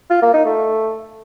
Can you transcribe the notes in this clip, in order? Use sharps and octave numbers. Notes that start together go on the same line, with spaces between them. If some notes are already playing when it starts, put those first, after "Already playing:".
F4
A#3
D#4
A3